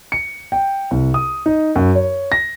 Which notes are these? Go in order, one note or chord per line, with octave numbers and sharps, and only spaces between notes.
C#7
G5
C2
D#6
D#4
F#2
C#5
A#6